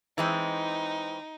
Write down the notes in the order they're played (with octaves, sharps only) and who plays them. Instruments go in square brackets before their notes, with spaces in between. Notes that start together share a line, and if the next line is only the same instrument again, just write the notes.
[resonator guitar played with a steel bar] E3 G#3 C4 [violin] D#4